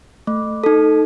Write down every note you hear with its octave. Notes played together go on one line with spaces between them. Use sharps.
A3
D#4 A4